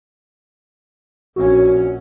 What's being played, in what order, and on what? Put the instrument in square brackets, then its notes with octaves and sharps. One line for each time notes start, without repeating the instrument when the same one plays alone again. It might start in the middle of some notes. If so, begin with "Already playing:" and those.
[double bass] A#1 C#4 [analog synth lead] F#4